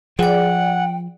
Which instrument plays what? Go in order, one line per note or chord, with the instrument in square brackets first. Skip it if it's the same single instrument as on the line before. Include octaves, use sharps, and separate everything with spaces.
[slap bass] F3 [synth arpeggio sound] G#4 D5 [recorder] F#5 [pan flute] G5